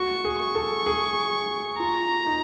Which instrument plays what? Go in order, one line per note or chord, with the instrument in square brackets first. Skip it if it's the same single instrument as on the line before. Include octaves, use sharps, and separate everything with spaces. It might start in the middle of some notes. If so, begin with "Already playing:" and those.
Already playing: [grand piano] F#4 [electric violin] C#6
[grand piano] G#4
[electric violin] C#6
[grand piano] A4
G#4
[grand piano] F4 [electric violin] A#5
[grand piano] D#4